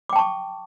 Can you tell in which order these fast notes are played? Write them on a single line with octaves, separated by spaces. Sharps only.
D6 G5 A5 C#6